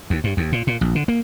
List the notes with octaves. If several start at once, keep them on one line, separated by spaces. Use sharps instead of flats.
D#2
G2
D#2
A#2
A#2
A#1
D3
A#3